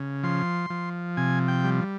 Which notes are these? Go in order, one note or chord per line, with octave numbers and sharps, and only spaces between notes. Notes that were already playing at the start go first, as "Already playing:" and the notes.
Already playing: C#3
F3 C6
F3
C3 G#5
G5
G3